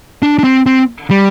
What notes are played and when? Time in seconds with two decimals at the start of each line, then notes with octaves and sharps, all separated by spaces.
0.23 D4
0.39 D4
0.44 C4
0.66 C4
1.10 G3